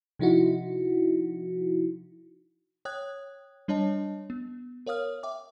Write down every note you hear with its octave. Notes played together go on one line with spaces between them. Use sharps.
C3 F3 D#4 E4 F#4
C#5 G5 D#6 F#6 G#6
G3 D4 C#5 D#5 A5
B3
A#4 C#5 F5 D#6 F6
E5 G5 D6